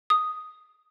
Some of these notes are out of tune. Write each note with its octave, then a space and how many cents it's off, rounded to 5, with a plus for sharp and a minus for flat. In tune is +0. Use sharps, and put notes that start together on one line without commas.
D#6 +0